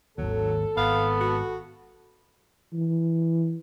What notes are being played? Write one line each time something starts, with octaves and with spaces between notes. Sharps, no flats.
G#1 D#2 F#3 A4
G#1 B3 F5
F#4
E3